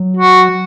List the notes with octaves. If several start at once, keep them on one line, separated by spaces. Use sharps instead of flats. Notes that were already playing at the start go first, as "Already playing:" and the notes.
Already playing: F#3
F#4